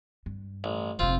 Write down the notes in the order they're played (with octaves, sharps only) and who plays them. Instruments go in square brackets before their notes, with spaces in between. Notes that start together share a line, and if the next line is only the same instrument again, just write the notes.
[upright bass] G2
[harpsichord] A1
[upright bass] F1 C3 [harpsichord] C4 F4